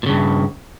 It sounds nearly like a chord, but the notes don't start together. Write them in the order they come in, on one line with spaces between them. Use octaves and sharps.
A#2 C#3 G2